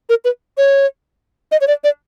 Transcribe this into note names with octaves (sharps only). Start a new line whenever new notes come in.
A#4
B4
C#5
D#5
C#5
D5
D5